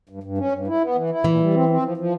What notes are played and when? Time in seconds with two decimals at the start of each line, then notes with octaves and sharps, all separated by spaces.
0.09 G2
0.23 G2
0.38 C#4
0.52 G2
0.67 E4
0.81 B3
0.95 E3
1.10 E4
1.24 A#2 E3
1.40 G3
1.54 C4
1.69 C4
1.83 F3
1.97 F3